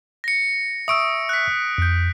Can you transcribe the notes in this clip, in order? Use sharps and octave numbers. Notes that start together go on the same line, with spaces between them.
A#6 C#7
E5 C#6 D#6 E6 D7
F#6 B6
F2 G6